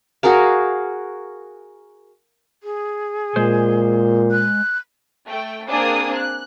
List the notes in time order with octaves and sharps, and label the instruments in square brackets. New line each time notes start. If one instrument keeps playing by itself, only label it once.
[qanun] F#4 G#4 A#4 F5
[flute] G#4
[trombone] A#2 [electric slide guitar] G#3 C5
[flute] F#6
[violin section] A3 G5
A#3 C4 D4 G#4 D#6
F#6